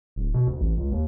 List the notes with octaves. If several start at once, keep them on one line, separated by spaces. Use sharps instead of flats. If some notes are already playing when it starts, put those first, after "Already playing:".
D1
B2
D2
A1
C#2
D#2